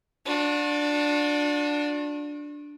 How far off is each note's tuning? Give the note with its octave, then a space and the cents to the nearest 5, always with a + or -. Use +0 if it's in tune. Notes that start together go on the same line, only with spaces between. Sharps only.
D4 +0 F#4 -45